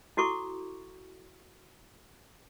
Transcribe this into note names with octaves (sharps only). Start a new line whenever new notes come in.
E4 F#4 A4 C#6 D6